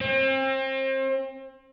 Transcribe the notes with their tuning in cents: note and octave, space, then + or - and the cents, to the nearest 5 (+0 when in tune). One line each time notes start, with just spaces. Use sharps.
C4 +35